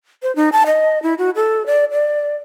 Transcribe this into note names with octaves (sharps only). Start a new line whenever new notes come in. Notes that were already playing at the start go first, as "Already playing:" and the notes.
C5
D#4
A5
D#5
E4
F#4
A4
D5
D5